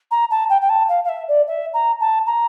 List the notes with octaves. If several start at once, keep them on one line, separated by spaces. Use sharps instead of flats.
A#5
A5
G5
G5
A5
F5
F5
E5
D5
E5
A#5
A5
A#5